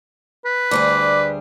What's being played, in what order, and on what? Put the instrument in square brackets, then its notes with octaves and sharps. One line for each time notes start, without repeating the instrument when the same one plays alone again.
[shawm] B4
[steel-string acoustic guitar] D2 G3 G#4 [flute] D6